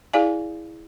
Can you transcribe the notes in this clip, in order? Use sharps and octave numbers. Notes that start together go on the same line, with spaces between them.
E4 G#4 D5 F5 G#5